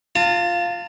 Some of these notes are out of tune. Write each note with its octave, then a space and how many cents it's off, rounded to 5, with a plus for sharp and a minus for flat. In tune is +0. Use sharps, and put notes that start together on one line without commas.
F4 +0 A5 +45